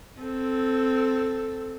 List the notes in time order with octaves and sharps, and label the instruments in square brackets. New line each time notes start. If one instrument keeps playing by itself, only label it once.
[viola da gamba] C4 A4